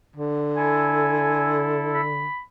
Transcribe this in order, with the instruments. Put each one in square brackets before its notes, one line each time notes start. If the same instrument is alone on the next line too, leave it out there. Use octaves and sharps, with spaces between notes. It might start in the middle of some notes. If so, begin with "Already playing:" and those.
[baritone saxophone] D3
[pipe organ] E4 A4 [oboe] G#5
[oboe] B5